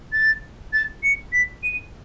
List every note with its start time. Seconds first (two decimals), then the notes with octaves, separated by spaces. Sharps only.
0.13 A6
0.73 A6
1.03 C#7
1.33 B6
1.63 D#7